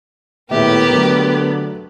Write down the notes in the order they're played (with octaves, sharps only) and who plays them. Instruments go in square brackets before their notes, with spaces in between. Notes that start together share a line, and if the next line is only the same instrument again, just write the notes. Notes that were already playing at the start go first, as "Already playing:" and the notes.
[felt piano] D#1 G#4 E5 [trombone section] A2 [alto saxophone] B3 [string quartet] G4 A#4
[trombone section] D3 [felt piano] F#3 A3